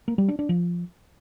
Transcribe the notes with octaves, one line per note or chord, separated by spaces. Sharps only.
A#3
G3
D4
D4
F3